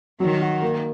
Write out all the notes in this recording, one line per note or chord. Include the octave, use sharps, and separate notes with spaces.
D#3 F#3
F#4
A#3